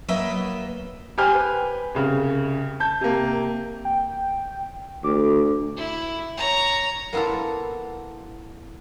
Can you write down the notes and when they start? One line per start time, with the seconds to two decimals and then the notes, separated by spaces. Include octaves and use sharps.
0.08 F#3 A#3 B3 B4 D#5 E5
1.18 G4 C5 G5 G#5 F6
1.34 B4
1.95 C2 C#3
2.80 A5 G6
3.01 C3 A#3
3.85 G5
5.04 D2 D6
5.77 E4
6.37 C#5 A#5
7.13 A#3 B3 E4 F4 A4